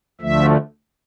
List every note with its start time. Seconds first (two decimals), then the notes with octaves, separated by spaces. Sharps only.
0.21 D2 D3 F3 A3 E5